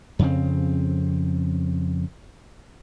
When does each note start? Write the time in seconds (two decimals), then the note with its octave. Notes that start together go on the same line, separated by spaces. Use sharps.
0.19 F2 C#3 C4